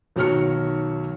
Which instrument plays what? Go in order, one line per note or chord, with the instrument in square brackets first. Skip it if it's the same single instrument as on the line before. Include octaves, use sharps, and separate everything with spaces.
[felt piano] B1 D#3 F#4 C#5 F6 C#7